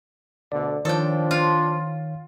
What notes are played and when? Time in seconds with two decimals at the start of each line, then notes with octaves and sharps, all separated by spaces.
0.52 D2 B2 D3 D5
0.85 D#3 F3 D4 A4 C#5 G5
1.31 F4